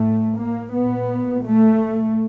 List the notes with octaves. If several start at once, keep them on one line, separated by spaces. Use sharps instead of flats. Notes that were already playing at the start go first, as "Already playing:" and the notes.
Already playing: A2 A3
A#3
A#2 B3
A3